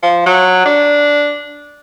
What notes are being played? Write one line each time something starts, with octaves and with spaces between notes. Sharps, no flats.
F3
F#3
D4